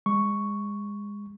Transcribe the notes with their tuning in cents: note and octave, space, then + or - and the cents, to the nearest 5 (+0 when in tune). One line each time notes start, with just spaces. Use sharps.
G#3 -25 C#6 +0